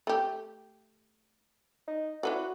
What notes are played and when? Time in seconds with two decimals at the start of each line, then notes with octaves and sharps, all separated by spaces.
0.07 A3 G4
1.87 D#4
2.23 E4 F#4 B4 D5